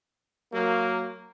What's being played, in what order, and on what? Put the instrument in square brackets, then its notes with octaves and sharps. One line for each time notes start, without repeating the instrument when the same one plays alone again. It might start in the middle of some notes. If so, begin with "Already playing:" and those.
[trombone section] F#3 A#3